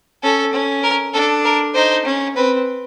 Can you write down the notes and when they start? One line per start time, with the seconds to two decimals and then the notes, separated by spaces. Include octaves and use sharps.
0.23 C#4 A4
0.53 C#4
0.84 A#4
1.14 D4 A4
1.45 A#4
1.75 D#4 C5
2.06 C#4
2.36 C4 B4